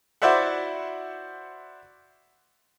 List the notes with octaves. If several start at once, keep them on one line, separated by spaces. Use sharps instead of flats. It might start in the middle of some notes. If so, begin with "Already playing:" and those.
E4 F#4 C5 D5 E5 F#5